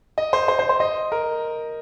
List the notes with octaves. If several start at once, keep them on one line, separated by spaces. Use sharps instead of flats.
D#5
C5
C5
C5
C5
D#5
A#4